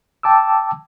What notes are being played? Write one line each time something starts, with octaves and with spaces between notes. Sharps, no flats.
G5 A5 D6 E6